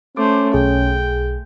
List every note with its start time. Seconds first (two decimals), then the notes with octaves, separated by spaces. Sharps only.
0.17 A3 C#4 C5 D6
0.54 B1 G#4 G5